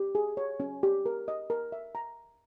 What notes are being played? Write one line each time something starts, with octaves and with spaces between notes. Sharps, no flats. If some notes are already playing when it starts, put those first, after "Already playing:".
Already playing: G4
G#4
C#5
C#4
G4
A#4
D#5
A#4
E5
A#5